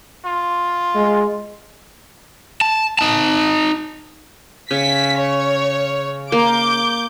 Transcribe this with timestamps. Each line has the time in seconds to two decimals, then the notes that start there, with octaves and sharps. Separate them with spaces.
0.25 F4
0.96 G#3
2.61 A5
2.99 D#4 A5
4.71 C#3 B6
5.18 C#5
6.32 A#3 D6 G6